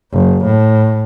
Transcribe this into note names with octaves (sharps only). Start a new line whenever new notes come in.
F#1
A2